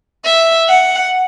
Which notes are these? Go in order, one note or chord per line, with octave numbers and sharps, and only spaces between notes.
E5
F#5